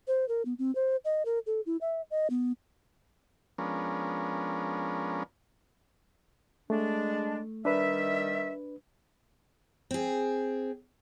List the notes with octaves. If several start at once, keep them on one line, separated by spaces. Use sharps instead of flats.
C5
A#4
B3
C4
C5
D#5
A#4
A4
E4
E5
D#5
B3
F3 G#3 B3 C#4 D4 A#4
G#3 A3 D4
D#3 G3 D4 B4 E5
C4 G#4